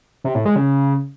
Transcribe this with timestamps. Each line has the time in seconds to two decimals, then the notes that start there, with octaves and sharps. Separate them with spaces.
0.24 C3
0.35 A2
0.45 G#3
0.56 C#3